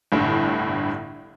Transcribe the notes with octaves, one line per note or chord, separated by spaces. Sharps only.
G1 C2 A2 D3